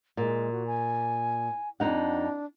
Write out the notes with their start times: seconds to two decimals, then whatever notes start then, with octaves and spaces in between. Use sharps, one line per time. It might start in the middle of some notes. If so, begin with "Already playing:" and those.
0.17 A#2 G#3
0.52 F#4
0.67 G#5
1.80 F2 D4 D#4 F#5